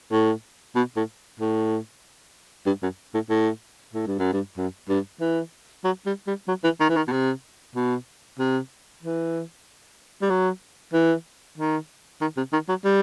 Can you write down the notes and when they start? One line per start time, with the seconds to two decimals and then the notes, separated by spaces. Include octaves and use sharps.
0.12 A2
0.75 B2
0.96 A2
1.39 A2
2.66 G2
2.82 F#2
3.14 A2
3.30 A2
3.94 A2
4.07 G2
4.19 F#2
4.33 G2
4.57 F#2
4.89 G2
5.21 E3
5.84 F#3
6.06 G3
6.27 G3
6.48 F#3
6.64 E3
6.80 D#3
6.89 E3
6.96 D#3
7.08 B2
7.12 C3
7.75 B2
8.39 C3
9.03 E3
10.22 G3
10.30 F#3
10.94 E3
11.58 D#3
12.21 D#3
12.37 C3
12.53 D#3
12.69 F#3
12.85 G3